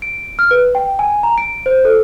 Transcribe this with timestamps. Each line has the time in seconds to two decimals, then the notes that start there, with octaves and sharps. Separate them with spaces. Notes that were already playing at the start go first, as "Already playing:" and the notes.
0.02 D7
0.39 F6
0.51 B4
0.75 G5
0.99 G#5
1.23 A#5
1.38 D7
1.66 C5
1.85 A4